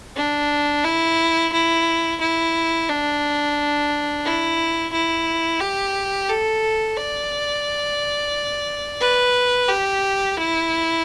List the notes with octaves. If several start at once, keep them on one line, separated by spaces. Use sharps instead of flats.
D4
E4
E4
E4
D4
E4
E4
G4
A4
D5
B4
G4
E4